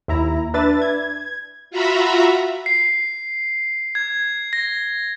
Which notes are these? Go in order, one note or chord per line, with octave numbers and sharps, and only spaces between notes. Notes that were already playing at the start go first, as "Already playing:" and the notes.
D#2 E4 A#5
D4 B4 E5 A6
G#6
F4 F#4 E5 A#5 B5
C7
G#6
A#6